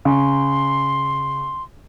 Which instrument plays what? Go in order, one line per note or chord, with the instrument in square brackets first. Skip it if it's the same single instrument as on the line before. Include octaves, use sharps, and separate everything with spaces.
[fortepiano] C#3 [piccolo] C6